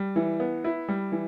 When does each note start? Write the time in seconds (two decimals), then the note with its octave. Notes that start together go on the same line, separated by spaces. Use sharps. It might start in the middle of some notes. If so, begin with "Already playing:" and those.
Already playing: G3
0.16 E3
0.40 B3
0.64 E4
0.89 G3
1.12 E3